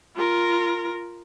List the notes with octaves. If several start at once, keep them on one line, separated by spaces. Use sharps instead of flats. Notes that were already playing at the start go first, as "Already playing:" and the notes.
F4 A#4